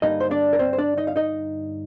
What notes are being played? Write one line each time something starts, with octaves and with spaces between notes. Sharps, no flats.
G2 D3 G3 A#3 D#4 D#5
C5
D4 D5
A#4
C4 C5
C5
D4 D5
D#4 D#5
F5
D#4 D#5